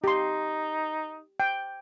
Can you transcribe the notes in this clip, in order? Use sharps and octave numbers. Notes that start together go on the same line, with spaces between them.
D#4 G4 C6
G5